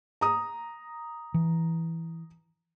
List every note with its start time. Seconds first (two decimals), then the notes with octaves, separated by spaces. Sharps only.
0.21 A#5 D#6
1.34 E3